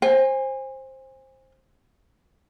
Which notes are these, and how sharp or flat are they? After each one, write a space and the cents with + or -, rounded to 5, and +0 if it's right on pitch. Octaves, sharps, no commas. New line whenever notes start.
C5 +15 G#5 -30